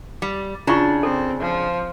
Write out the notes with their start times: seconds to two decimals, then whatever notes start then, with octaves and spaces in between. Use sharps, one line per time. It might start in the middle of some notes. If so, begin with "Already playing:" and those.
0.22 G3
0.67 C#3 D4 E4 F4 C#6
1.03 C4 A4
1.40 F3